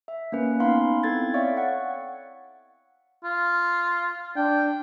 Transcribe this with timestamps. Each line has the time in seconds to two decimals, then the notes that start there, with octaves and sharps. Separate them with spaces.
0.08 E5
0.32 A#3 C#4 B4
0.60 B3 C#4 D#4 F5 B5 C6
1.03 B3 C4 E4 A4 G#6 A6
1.34 C#5 D5 E5 F5 G5 C#6
1.57 F#5
3.24 F4
4.36 D4 G5